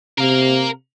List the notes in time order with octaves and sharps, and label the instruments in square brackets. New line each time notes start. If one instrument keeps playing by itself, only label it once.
[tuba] C3 [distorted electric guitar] A#4 F5